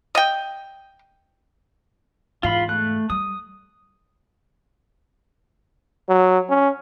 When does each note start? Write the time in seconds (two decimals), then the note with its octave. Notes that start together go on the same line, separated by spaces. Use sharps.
0.15 D#5 G5
2.43 E2 G#2 F4 F5 B5
2.69 A3 F#6
3.10 G3 D#6
6.09 F#3
6.49 C#4